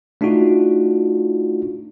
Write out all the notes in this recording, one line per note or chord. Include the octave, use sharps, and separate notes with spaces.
A3 D4 D#4 F4 F#4